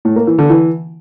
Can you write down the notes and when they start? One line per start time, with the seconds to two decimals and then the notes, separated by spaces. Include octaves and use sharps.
0.05 A2
0.16 A#3
0.27 E3
0.39 D3
0.50 E3